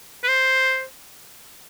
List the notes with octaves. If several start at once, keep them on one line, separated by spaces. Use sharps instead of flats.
B4
C5